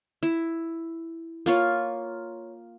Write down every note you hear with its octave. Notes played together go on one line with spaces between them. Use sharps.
E4
A#3 F4 C#5